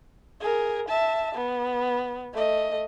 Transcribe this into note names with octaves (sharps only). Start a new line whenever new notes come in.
G#4 A#4
E5 A5
B3
A3 D#5